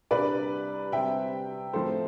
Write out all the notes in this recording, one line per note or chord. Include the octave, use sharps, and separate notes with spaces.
C2 C3 G3 D4 B4 D5
C3 G3 C4 E5 G5
A2 F3 C4 A4 C5